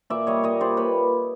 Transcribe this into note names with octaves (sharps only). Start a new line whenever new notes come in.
A#2 D5 E5
G3 C#5 D#5
A#2 C#5 D#5
G3 C5 D5
A#2 B4 C#5